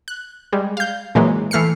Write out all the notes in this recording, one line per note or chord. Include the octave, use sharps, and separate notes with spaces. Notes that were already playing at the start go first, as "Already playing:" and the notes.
F#6
G3 G#3
F5 G6
A#2 E3 F#3 G#3 A#3
E3 A3 F6 C7 C#7